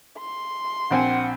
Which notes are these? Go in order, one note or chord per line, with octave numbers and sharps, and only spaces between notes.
C6
A#1 C4 F#5 G#5